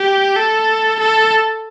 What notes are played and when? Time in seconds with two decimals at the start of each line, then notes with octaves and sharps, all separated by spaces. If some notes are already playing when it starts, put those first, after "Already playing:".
Already playing: G4
0.36 A4
1.00 A4